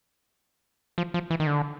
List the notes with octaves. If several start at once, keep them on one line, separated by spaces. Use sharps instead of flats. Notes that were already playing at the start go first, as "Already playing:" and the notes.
F3
F3
E3
D#3
D3